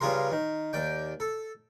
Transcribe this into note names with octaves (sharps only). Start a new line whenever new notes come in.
G2 C#3 F4 G#4 A#4 C6
D#3
D#2 D5 G5
A4